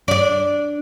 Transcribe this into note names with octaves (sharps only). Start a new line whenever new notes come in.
D4 D5